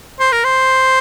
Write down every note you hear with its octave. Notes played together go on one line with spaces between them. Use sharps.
C5
A#4
C5